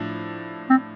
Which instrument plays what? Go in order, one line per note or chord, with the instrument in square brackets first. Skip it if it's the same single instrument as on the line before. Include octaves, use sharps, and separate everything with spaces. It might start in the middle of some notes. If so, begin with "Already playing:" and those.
Already playing: [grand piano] A2 F3 D4
[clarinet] C4